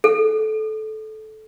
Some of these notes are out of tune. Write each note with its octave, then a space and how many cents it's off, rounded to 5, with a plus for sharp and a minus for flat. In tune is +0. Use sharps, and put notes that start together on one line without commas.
A4 -20